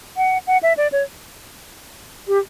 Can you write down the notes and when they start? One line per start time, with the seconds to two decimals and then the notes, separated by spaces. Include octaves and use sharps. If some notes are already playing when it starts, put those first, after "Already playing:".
0.17 F#5
0.47 F#5
0.63 E5
0.77 D5
0.92 C#5
2.28 G4